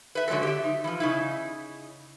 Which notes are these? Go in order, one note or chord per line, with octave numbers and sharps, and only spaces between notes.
B4 E5
D3 F#3 G#3 A3 A4
G4 E5
D#4
E3 F3
C#3 D#4 E4